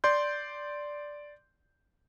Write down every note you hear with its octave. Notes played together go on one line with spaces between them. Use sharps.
D5 C6 G6